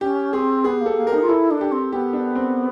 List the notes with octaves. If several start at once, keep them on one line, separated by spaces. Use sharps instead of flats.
C#4 G4
C4 G#4
B3 G#4
A#3
A4
A#3
A#4
D#4
F4
E4 A4
D4
G4
C4
B3 G4
D4
C4